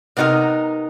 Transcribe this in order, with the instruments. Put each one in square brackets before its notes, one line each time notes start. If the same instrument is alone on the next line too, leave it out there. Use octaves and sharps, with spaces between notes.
[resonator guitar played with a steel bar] C3 B3 D#4 F#4 A#4